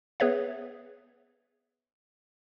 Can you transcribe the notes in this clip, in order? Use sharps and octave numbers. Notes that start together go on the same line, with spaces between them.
B3 G#4 B4 C#5 E5